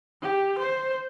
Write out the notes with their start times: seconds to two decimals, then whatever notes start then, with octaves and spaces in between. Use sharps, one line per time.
0.22 G4
0.59 C5